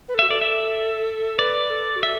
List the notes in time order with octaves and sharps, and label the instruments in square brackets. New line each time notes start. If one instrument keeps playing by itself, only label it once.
[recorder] B4
A4
[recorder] F#4 [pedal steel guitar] E5
[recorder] A4 [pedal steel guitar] D5
[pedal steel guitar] E5
[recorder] B4 [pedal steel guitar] D5
[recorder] A4
F#4
[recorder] A4 [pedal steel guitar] E5